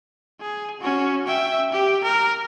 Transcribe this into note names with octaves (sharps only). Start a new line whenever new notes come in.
G#4
C#4 F#4
E5 G5
G4
A#4